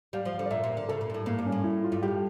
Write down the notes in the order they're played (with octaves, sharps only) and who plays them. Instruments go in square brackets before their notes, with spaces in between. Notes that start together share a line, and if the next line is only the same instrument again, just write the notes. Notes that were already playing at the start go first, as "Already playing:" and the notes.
[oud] G3 [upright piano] F5
[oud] F3
[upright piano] F5
[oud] D3
[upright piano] D5
[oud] A#2 [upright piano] E5
[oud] A#2
[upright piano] A#4
[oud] D3
[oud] C#3 [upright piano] A4
[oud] A#2
G2
A2
[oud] A2 [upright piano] A#3
[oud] G2
[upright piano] C#4
[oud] A2
[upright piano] E4
F4
[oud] G2
[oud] A2 [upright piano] G4